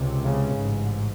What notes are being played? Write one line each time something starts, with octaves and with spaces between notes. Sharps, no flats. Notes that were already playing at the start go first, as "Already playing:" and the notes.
Already playing: C#2 C3
C#3
A1 G#2